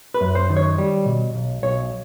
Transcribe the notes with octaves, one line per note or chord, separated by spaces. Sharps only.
B4
F#2
C5
D#3
C#5
G3
B2
B1
B1 C#5